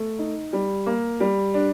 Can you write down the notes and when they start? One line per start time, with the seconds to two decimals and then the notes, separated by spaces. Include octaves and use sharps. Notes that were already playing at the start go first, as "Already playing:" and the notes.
Already playing: A3
0.19 D#4
0.53 G3
0.86 A#3
1.20 G3
1.54 D4